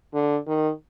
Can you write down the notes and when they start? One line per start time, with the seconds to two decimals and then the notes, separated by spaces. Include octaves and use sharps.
0.14 D3
0.47 D#3